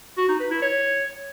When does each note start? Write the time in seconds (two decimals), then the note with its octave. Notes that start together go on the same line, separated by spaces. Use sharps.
0.17 F#4
0.29 D#4
0.40 B4
0.51 E4
0.62 C#5